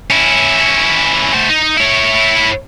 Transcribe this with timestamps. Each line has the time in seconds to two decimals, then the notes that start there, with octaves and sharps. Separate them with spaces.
0.10 C#4 E4
1.34 A3 C5
1.49 D#4
1.76 E4 C#5